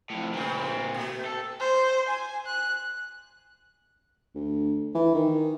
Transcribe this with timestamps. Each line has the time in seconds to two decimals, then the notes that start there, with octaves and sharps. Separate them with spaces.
0.10 F2 A2
0.33 G2 A#2 C#3 C4
0.94 B2 A3
1.26 A4
1.60 C5
2.08 G#5
2.46 F#6
4.35 D2
4.95 E3
5.14 D#3